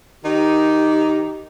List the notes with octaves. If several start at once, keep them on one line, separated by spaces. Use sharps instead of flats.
D#3 D#4 G4